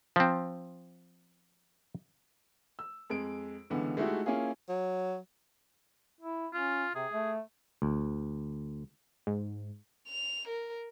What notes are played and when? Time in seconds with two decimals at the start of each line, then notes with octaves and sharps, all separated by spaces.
0.16 F3 C4
2.79 E6
3.10 F2 G#3 D7
3.70 C#2 D3 E3 B3
3.97 G#3 A3 D#4 E4 F#4 G4
4.26 A#3 C#4 E4 F4 G#4
4.69 F#3
6.21 E4
6.53 C#4 F4
6.95 C3 G#4
7.12 A3
7.82 D2
9.27 G#2
10.08 F7
10.48 A#4